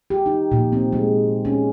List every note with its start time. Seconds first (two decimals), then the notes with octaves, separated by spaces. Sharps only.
0.10 G4
0.26 D#4
0.51 A#2
0.72 C4
0.93 G#3
1.45 C#4